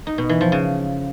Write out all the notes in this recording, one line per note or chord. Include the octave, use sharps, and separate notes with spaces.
D#4
B2
E3
F3
C#3